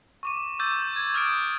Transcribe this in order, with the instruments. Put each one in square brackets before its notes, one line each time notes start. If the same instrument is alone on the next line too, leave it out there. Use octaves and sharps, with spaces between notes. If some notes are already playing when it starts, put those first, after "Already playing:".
[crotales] C#6 D6 D#7
D6 E6 G6 A6
G#6
D#6 F6 A6 D7